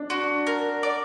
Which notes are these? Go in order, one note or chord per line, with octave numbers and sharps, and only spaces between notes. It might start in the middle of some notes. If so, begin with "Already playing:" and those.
Already playing: D4
F#4
A#4
D5